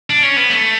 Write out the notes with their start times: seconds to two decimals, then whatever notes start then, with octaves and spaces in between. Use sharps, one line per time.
0.10 D4
0.23 C#4
0.37 B3
0.50 A3